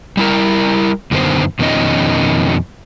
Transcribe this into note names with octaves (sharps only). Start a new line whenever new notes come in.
G3 E4 A#4
F#2 D3 D#3 B3 C5
F2 B2 D#3 C#4 D#5